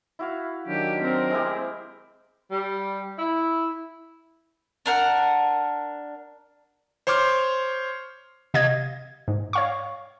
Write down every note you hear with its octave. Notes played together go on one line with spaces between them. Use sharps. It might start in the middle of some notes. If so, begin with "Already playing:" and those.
E4 F#4 F5
D#3 F#3 D4 G4
C4 A#4
G#3 E4 G4
G3
E4
D4 A#4 F#5
C5 C#5 C6 D6 F6
C3 D#5 F5 G#6
G#2
C#5 F5 C#6